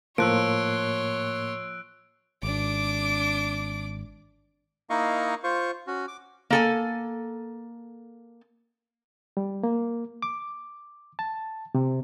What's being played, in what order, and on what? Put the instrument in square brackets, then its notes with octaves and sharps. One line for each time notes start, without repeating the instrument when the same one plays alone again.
[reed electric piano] A2 A#3 [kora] F3 [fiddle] C#5 C6 [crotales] E6 F#6 D7
[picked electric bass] G#1 [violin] D4 D6
[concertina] A#3 D#4 E4 D#5 F5 C#6
F4 C5 C#6
C#4 F#4
D6
[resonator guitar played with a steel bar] A#3 A4 G#5
[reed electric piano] G3
A#3
D6
A5
C3